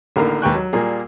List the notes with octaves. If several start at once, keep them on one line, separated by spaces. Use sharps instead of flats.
A1 D3 D#3 A#3 F5
D#2 G#3 B4 G5 C#6 F#6
F#3
A#2 G3 A#3 G#4